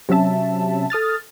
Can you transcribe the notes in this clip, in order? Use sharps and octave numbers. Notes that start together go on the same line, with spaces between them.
C3 F#3 C#4 E5 A5
A4 D#6 F6 A6